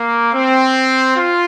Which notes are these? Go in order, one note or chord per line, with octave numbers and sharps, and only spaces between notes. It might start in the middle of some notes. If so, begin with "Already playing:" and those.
Already playing: A#3
C4
F4